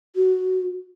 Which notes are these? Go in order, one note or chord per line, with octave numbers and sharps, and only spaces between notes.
F#4